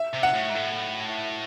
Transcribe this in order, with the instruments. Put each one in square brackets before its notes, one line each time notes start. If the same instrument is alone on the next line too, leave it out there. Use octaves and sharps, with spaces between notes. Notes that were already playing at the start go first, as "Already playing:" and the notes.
Already playing: [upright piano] E5
[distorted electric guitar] C3
[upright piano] F#5
[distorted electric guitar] A2
G#2
A2